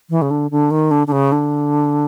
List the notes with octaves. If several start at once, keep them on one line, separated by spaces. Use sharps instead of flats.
E3
C#3
D3
D3
D#3
D3
D3
C#3
D3